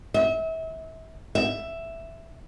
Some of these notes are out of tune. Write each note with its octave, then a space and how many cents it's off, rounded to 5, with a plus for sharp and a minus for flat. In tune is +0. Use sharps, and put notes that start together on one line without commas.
E5 -35
E5 +5